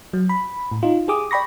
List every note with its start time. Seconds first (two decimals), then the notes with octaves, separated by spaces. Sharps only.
0.13 F#3
0.29 B5
0.71 A2
0.83 D#4 F4
1.08 G4 G#4 D6 D#6
1.31 D5 G5 B5 C#6 A#6